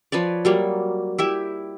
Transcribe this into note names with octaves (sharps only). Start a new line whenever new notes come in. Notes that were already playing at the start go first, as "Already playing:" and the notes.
F3 B4 C#5 D5
F#3 G3 A#3
E4 G4 E5